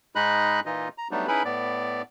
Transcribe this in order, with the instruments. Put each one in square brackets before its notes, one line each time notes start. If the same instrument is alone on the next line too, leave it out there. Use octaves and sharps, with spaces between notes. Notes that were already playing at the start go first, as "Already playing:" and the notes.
[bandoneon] G#2 G#3 D#4 D#5 B5 F#6
A#2 E3 D#4 F4 D#5
A#5
F#3 G3 A3 B3 D4 D#4
C#4 D#4 E4 G#4 B4 B5
A2 B3 D5